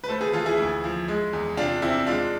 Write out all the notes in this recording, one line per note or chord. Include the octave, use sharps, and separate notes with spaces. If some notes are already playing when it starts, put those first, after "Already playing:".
B4
A3 A4 C5
G#4 B4
E3 F4 A4
E4 G#4
D2
F3
G#3
E2
C3 D4 F4
E2 C4 E4
G#3 D4 F4